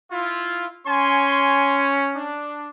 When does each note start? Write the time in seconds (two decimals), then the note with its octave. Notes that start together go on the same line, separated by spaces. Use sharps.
0.12 E4 F4
0.87 C#4 C#5 G#5 C6
2.16 D4